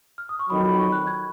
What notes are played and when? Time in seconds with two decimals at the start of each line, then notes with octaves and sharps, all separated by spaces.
0.18 F6
0.29 D#6
0.39 C#6
0.50 F2 D#3 F#3 B5
0.65 B5
0.79 C#6
0.92 F#6
1.07 G#6